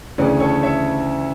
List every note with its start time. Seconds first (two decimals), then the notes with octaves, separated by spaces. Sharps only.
0.18 D2 C#3 E3 A3 C#4 B4 D5
0.40 A4 C#5
0.63 C#5 E5